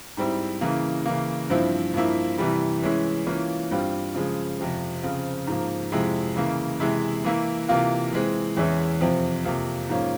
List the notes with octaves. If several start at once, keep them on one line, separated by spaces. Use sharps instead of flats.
G#2 G3 C4 E4
C#3 E3 A#3
C#3 E3 A#3
G2 F3 C4 E4
G2 F3 A#3 E4
C3 E3 G3
E3 G#3 C#4 E4
E3 A#3 C#4 F4
G2 G3 C4 F4
C#3 F3 G#3
F2 C3 F3
C#3 F3 C4 F4
G#2 F3 A#3
F2 C3 F3 G#3 E4
C#3 E3 A#3
C3 E3 G#3 E4
E3 A#3 E4
C3 E3 A#3 F4
E3 G#3 C4
E2 E3 G#3 C#4 E4
F2 C3 F3 C4
F2 C3 F3 A#3
G#2 F3 A#3 C#4 F4